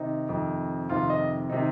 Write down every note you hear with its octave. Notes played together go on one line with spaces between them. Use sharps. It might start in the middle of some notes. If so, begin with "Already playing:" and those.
Already playing: C3 D#3 D#4
F2 C3 D#3
F2 C3 D#3 F4
D#5
C3 D#3 D#4